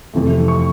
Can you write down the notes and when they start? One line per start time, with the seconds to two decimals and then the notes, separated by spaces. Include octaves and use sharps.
0.13 F2 C3 E3 A3
0.48 C#6